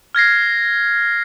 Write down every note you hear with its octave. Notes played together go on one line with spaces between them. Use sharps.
F6 G#6 A#6 C7